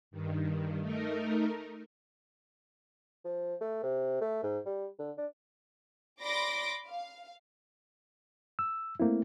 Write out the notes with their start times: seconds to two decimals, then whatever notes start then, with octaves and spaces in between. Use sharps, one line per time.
0.11 G2 D#3
0.80 A3 D#4 A#4
3.25 F3
3.61 A3
3.83 C3
4.21 A3
4.43 G#2
4.66 G3
4.99 D3
5.18 D4
6.22 D5 B5 C6 D6 A#6 D7
6.87 F5
8.59 E6
9.00 A3 A#3 C4 E4